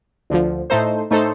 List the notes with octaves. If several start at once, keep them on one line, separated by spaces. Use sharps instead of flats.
D2 D3 F3
A2 A3 D#4 A4 C5
A2 A3 D#4 A4 C5